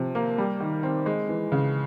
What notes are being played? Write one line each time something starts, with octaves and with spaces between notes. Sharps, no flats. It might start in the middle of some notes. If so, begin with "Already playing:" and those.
Already playing: C3 F3
A#3
G3
D#3
C4
G#3
E3
C#3